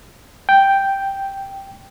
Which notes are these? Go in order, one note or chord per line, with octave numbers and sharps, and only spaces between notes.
G5